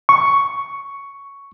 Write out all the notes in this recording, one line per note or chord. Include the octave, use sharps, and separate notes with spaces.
C#6